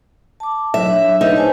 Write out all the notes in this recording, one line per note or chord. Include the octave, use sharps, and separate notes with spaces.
A5 D6
F#3 E5
D4 C#5
D#4 G#4 B4
C5 G#5 A5